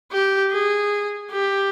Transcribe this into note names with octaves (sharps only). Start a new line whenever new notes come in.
G4
G#4
G4